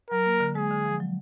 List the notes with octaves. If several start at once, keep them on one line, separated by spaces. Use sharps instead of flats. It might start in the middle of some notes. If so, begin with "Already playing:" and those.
F#3 A#4
A#3
D3
G#3 G#4
D3
F3
F#3